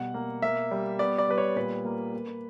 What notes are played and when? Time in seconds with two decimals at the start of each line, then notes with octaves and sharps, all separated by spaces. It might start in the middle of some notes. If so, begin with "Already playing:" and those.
Already playing: B2 G3 F#5
0.14 A#3
0.42 A#3 E5
0.71 G3
0.99 B3 D5
1.18 D5
1.28 G3 B4
1.38 C#5
1.56 A#2 B4
1.85 A#3
2.14 A#3